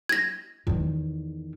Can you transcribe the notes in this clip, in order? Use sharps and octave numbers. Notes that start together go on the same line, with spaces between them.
G#6 A#6
E2 D#3